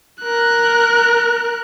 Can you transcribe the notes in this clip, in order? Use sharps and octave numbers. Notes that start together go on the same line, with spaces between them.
A#4 F#6